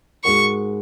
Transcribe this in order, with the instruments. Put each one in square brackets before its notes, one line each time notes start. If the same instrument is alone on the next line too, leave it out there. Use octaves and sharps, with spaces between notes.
[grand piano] G#2 G#3 F#4 A#4 [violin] C#6